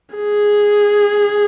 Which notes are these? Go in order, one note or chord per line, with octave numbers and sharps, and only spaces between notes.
G#4